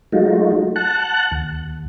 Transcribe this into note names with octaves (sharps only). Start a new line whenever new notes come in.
F#3 G#3 A3 D#4 F4 F#4
F#5 A5 F#6
D#2